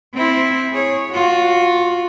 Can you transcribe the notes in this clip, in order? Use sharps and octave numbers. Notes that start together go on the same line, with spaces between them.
C4 E4
G#4 C#5
F4 F#4